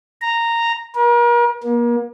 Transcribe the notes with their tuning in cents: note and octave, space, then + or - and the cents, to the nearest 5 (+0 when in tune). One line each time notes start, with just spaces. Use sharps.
A#5 -10
A#4 +40
A#3 +35